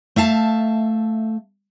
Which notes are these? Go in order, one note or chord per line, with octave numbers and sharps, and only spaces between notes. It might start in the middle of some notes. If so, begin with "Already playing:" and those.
A3 E5 F5 A5